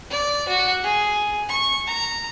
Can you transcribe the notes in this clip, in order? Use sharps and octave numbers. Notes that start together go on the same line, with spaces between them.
D5
F#4
G#4
C#6
A#5